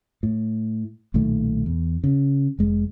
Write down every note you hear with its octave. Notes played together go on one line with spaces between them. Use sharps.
A2
B1 A#2 D#3 A3
E2
C#3
F1 G#3